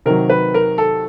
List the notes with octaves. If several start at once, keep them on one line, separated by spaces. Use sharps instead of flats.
C3 D#3 F#3 A#4
B4
A#4
A4